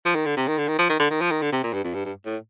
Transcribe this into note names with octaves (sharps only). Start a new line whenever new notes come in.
F3
D#3
D3
C3
D#3
D3
D#3
F3
D#3
D3
D#3
F3
D#3
D3
C3
A#2
G2
F2
G2
G2
A2